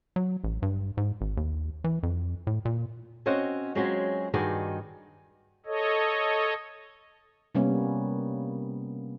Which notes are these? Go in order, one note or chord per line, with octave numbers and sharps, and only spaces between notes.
F#3
A1
G2
G#2
G#1
D#2
E3
F2
A2
A#2
C4 C#4 F#4 C5 D#5 F#5
F#3 G#3 C4 C#4 F4 F#4
G2 D#3 D#4 F#4 G#4 D5
A4 C#5 D#5
C3 G3 A#3 B3 C#4